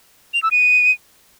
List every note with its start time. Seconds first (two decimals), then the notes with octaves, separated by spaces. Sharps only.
0.34 F7
0.43 E6
0.51 D#7